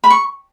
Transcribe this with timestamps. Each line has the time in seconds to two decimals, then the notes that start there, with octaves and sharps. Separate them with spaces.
0.04 B5
0.10 C#6